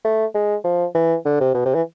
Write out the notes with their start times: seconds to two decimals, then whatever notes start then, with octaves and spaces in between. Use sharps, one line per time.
0.04 A3
0.34 G#3
0.64 F3
0.94 E3
1.25 D3
1.40 C3
1.54 B2
1.65 C3
1.75 E3